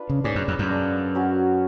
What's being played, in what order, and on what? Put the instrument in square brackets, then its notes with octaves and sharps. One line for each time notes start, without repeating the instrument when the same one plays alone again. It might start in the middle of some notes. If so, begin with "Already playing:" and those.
Already playing: [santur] D4 F4 B4
[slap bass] C#3
[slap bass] G#2 [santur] G#3 C#4 G#4 D5
[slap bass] F#2
F2
F#2
[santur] D4 G#4 D5 F5
F#3 C#4 F#4 C#5